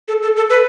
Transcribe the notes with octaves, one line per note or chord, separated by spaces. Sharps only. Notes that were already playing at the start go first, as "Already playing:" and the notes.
A4
A4
A4
B4